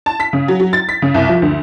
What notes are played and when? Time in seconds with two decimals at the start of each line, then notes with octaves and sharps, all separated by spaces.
0.06 A5
0.20 B6
0.33 C#3
0.48 F#3
0.60 F#3
0.73 A6
0.89 B6
1.02 C#3
1.14 C2
1.29 F3
1.42 D2